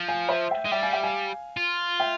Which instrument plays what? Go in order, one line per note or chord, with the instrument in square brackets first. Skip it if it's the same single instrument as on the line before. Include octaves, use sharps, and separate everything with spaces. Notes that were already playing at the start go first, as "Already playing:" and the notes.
Already playing: [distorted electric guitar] F3
[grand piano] F5 G#5
C5 E5
E5 G5
[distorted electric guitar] G#3
[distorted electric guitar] G3 [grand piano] E5 G5
[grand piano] F5 G#5
E5 G5
F5 G#5
[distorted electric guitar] F4
[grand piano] E5 G5